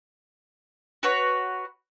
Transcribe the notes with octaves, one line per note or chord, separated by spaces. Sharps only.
F#4 B4 C#5